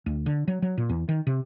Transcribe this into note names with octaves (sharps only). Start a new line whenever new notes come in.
D2
D3
F#3
F#3
A#2
E2
D#3
C3